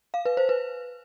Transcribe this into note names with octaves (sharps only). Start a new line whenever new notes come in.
F5
B4
C5
B4